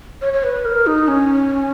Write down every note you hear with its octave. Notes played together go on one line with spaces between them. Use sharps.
C#5
C#5
B4
A#4
D#4
C#4